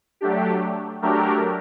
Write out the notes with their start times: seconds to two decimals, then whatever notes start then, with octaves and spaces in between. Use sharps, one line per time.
0.21 F#3 A3 D4 G4
1.02 F#3 A3 D4 G4 A#4